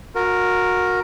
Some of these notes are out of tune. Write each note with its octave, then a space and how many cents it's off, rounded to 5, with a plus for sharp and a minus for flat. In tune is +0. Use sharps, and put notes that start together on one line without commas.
F#4 -25 A#4 +0